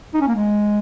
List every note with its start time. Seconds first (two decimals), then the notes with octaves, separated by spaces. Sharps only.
0.14 D#4
0.21 C#4
0.28 A#3
0.35 G#3